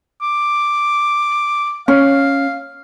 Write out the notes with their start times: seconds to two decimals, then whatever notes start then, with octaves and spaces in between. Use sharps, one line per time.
0.22 D6
1.88 C#4 F5